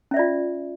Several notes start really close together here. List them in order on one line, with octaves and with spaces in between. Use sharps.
C#4 E5 D5 F4